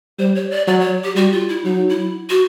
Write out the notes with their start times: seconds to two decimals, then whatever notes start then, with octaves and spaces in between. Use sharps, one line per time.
0.19 G3 C5
0.35 C#5
0.51 D5
0.67 F#3 D5
0.80 C#5
1.04 G4
1.16 G3 F#4
1.32 F4
1.49 E4
1.65 F#3 D#4
1.90 E4
2.30 F#4